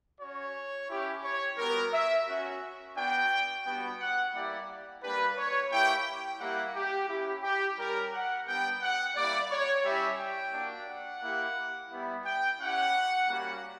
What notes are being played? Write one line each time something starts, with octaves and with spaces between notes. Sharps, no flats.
C#4 F#4 C#5
C#4 E4 G4
C#5
G3 B3 F#4 A#4
E5
C#4 F#4
B3 D4 F#4 G5
G3 B3 D4 F#4 G5
F#5
G3 A#3 E4 G4 D5
G3 A#3 D4 G4 B4
C#5
A#3 E4 G4 G5
G3 A#3 E4 G4 F#5
G4
C#4 E4 G4
G4
G3 C#4 G4 A#4
F#5
G3 B3 D4 G5
F#5
G3 A#3 E4 D5
C#5
G3 C#4 E4 G4 E5
G5
A#3 D4 F#4
F#5
A#3 E4 G4
G3 B3 E4
G5
C#4 E4 G4 F#5
G3 A#3 C#4 F#4